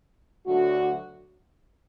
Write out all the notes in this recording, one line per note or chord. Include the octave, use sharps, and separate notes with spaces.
D2 D3 F#3 A3 F#4